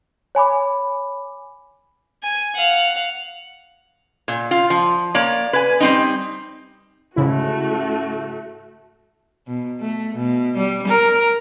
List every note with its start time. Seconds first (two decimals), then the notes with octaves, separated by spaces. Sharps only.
0.35 C#5 G#5 B5 D6
2.23 G#5
2.55 F5 F#5
4.28 A#2
4.51 F4
4.70 F3
5.15 A#3 C#5 D5
5.53 B4 G#5
5.80 G3 C4 D#4
7.16 G#2 C#3 A3 E4 F#4
9.47 B2
9.81 A3
10.15 B2
10.57 G3
10.88 A#4